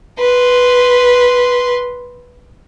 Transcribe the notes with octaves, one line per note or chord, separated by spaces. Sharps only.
B4 C6